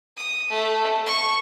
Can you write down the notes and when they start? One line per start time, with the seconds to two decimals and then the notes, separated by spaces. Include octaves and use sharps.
0.17 D#6
0.50 A3
1.06 C#6